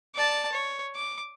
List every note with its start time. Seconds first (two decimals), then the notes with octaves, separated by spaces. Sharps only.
0.15 D5 A5
0.52 C#5
0.96 D6